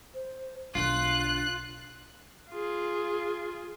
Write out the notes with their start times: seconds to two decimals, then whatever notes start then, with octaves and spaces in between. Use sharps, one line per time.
0.14 C5
0.75 B1 D3 D4 F4 F#6
2.51 F4 G#4